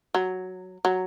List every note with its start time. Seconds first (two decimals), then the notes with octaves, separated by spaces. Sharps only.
0.15 F#3
0.85 F#3